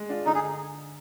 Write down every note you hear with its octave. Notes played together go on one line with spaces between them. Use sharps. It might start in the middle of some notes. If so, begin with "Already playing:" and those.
Already playing: G#3
D4 F4
D3 D#4
G#4